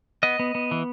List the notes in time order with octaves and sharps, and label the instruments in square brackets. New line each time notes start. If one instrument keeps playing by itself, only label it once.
[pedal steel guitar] B3 D#5
B3
B3
E3